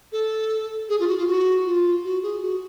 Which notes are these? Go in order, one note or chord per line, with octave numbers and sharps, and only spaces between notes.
A4
G#4
F4
F#4
F4
F#4
F4
F#4
G#4
F#4